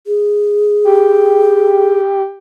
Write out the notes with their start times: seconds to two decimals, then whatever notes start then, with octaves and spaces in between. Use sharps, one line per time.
0.07 G#4
0.85 G4